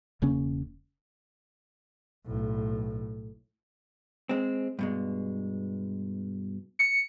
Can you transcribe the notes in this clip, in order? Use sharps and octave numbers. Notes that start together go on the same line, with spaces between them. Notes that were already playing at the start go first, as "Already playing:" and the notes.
E1 C#3 A#3 C#4
B1 A2
G#3 C4
G2 B2 G#3
C#7